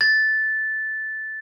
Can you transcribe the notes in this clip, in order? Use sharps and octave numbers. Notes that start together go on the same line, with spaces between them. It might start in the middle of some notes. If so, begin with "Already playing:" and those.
A6